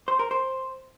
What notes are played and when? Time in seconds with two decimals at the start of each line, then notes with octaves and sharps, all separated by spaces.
0.08 C5
0.19 A#4
0.31 C5